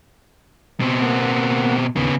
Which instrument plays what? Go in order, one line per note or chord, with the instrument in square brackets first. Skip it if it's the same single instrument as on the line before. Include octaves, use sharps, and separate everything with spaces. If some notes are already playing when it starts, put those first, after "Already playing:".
[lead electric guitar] B2 C4
[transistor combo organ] A#3 B3 F#5
[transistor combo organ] D#2 [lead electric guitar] C#3 B3